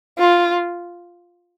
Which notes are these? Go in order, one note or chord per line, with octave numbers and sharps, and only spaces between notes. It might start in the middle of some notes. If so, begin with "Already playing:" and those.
F4